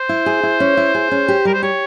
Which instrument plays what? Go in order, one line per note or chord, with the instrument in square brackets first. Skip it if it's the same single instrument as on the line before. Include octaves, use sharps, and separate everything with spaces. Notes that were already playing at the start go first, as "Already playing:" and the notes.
Already playing: [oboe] C5
[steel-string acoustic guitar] E4
G#4
E4
C#4
E4
G#4
C#4
G4
[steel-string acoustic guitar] G3 [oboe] A#4
[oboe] C5
[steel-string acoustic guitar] G4 [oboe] C#5